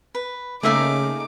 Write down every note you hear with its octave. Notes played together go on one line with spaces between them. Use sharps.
B4
C#3 A3 A#3 D#4 G#4 E5 F5 D6